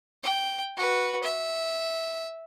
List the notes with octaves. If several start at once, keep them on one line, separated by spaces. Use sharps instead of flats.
G5
F#4 B4
E5